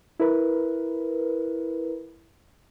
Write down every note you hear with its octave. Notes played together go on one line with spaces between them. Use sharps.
E4 A#4 B4